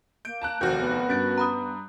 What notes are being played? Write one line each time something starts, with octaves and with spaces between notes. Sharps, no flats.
A#3 G6 D7
A5 A#5 F#6
F1 D#2 F#4 A#4 C5 G6
B3
G2 C#4 A6 D7
A#5 B5 D#6